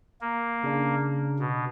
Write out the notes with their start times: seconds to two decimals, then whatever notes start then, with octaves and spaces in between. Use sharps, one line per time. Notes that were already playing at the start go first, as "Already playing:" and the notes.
0.21 A#3
0.64 C#3 D4
1.39 B2